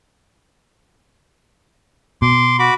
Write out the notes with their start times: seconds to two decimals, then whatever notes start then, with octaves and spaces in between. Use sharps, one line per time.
2.22 B2 C6 D6
2.59 F#4 B5 D6